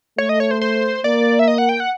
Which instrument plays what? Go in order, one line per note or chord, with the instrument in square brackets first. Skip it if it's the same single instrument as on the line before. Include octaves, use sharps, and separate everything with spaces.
[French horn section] A3 [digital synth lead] C#5
[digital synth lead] D#5
C#5
C5
C5
[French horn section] A#3 [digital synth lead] D5
[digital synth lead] E5
D#5
F#5
G5
F#5